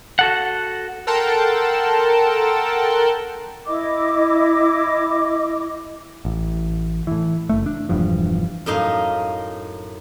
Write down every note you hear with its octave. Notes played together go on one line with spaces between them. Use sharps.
F#4 A4 F#5
A4 A#4 F#5 G5 A5 C6
E4 D#5 D6
A1
A2 E3
F#1 A3
D4
E1 E2 G2 F3
F#2 A2 D#4 F5